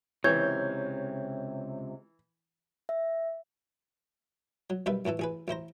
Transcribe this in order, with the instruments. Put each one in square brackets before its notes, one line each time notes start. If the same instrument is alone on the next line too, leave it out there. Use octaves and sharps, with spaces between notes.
[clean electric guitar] C#2 C3 [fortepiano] E3 [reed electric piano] C#5 G6 [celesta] G#6
[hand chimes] E5
[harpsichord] F#3
B1 D#3 G3 B4 E5
A1 A2 E3 A4
A1 G#4 B4
A1 E4 C5 A#5